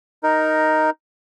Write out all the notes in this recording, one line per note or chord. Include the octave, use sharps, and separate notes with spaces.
D#4 A#4